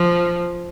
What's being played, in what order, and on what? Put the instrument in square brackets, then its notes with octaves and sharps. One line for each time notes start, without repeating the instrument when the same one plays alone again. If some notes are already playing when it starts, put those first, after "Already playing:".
Already playing: [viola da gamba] F3